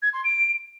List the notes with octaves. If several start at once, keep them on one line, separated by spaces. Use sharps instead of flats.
G#6
C6
D7